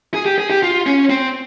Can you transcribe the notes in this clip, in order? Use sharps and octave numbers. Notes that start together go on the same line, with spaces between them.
G#4
G4
G#4
G4
F4
C#4
C4